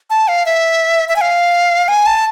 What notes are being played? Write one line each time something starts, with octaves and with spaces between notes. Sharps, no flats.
A5
F5
E5
E5
G#5
F5
G#5
A5